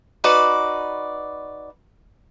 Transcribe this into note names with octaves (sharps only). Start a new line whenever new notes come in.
D#4 F#4 B4 D5